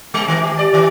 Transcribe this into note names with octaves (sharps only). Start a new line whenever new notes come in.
G3
D#3
G4
D5
D#3